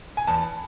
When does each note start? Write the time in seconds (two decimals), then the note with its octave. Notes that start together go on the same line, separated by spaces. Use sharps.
0.17 G#5
0.27 E2 A5